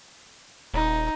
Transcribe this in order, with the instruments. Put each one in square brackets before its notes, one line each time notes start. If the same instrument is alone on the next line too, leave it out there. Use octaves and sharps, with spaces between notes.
[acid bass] D#1 [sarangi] D#4